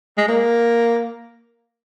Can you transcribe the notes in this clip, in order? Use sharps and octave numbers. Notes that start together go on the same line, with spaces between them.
G#3
A#3